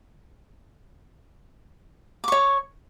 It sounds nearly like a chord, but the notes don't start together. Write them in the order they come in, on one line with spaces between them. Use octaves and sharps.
D6 C#6 C#5